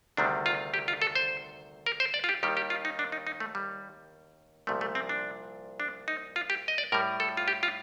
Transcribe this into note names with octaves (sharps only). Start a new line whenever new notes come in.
D2 C3 D#3 G3 D4
F4
G4
F4
A4
C5
A#4
C5
D5
F4
G4
D#2 D#3 G3 G4
G4
F4
D#4
D4
D#4
D#4
A3
G3
C2 A#2 F3 A3
A3
C4
D4
D4
D#4
F4
G4
D#5
D5
A2 G3 A#4
A4
F4
G4
F4